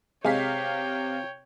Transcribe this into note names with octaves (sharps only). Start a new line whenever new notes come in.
C3 G#3 C#5 F5 G5 B6